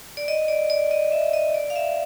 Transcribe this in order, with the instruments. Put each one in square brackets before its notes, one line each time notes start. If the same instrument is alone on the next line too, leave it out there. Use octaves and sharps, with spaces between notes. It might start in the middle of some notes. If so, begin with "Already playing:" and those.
[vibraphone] D5
D#5
D5
D5
D#5
E5
D#5
D5
F5
E5